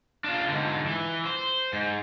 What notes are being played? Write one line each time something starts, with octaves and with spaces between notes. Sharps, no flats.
D4 F4
G#2 D3
E3
C5
G#2